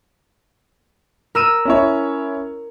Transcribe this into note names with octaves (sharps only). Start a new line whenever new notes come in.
A#4 E6 D#7
C#4 E4 C#5